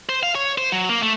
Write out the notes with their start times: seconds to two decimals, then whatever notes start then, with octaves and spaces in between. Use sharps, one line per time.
0.09 C5
0.23 F5
0.35 C#5
0.58 C5
0.72 F#3
0.89 A#3
1.03 A3